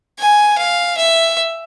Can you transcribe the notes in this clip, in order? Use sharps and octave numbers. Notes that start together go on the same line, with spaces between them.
G#5
F5
E5